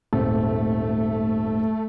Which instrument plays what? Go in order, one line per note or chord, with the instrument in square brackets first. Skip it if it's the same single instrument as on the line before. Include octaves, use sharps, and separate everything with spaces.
[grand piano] D#1 G#2 C4 [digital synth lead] A3